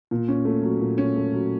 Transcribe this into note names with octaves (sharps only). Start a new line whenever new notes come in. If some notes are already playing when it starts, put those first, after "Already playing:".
A#2
C#4
A3
F#3
A#2
C#4
A3
F#3